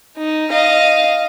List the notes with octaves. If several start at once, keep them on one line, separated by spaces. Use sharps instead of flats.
D#4
D#5 F5